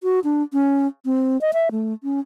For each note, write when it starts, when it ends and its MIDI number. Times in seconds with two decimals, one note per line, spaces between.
0.03 0.20 66
0.24 0.43 62
0.53 0.87 61
1.05 1.40 60
1.41 1.51 75
1.53 1.69 76
1.72 1.93 57
2.04 2.20 61